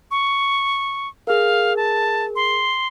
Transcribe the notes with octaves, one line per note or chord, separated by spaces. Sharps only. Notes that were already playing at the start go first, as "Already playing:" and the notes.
C#6
G#4 A#4 F5
A5
C6